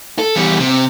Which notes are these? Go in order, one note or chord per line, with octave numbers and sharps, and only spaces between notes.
A4
E2 G3
C3